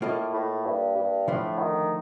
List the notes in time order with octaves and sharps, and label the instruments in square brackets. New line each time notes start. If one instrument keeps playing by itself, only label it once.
[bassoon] A2 [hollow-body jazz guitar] A#3 F4 A4 D#5
[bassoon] A2
G2
G2
[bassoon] A2 [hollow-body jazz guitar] D3 F3 A3
[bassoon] D#3